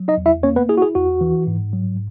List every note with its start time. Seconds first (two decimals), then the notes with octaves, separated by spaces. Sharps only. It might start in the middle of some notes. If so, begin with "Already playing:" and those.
Already playing: F#3
0.08 D#4 D#5
0.17 E2
0.26 E4 E5
0.43 A#3 C#4 C#5
0.56 B3 B4
0.69 E4 G#4
0.77 F#4
0.82 G#4
0.95 E2 F#4
1.21 E3
1.47 G#2
1.73 F#3